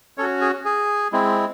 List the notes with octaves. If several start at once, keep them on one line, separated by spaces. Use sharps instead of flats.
C#4 F#4 A4 C#5
G#4
G#4
G#3 C4 E4